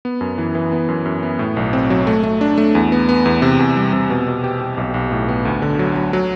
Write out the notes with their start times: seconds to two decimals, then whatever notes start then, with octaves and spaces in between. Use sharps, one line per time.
0.05 B3
0.21 F#2
0.38 E3
0.55 E3
0.72 B3
0.89 F#2
1.06 F#2
1.23 B3
1.39 A2
1.57 B1
1.73 C4
1.90 F#3
2.07 A3
2.23 A3
2.41 D4
2.58 A3
2.75 E2
2.92 B3
3.09 B3
3.26 E2
3.42 C3
3.59 E2
3.76 G3
3.93 C3
4.10 B2
4.27 B2
4.44 G4
4.61 G4
4.78 B1
4.94 B1
5.11 A2
5.28 B3
5.45 D2
5.62 D3
5.79 F#3
5.96 F#3
6.13 F#3